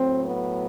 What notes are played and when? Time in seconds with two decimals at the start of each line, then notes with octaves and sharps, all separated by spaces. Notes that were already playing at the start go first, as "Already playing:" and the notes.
Already playing: A2 F#3 C4
0.25 B3